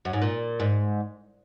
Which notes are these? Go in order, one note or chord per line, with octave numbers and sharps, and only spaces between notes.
F#2
G#2
A#2
G#2